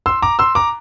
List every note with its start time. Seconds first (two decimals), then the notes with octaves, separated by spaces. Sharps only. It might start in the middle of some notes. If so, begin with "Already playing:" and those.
0.06 C6 E6
0.22 A#5 D6
0.39 C6 E6
0.55 A#5 D6